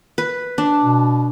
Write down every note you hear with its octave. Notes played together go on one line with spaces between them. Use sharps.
B4
D4
B2